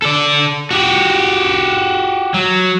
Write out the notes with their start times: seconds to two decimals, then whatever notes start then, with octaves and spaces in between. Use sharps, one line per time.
0.02 A4 D5
0.71 F#4 G4
2.34 F#3